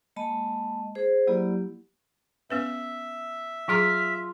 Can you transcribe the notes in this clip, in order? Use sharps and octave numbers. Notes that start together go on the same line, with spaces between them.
G#3 A#3 D#5 A5 B5
G#4 C5
F#3 A#3 E4 G4 D5 B5
B3 C#4 B4 E5
F#3 F4 G#4 A#5 B6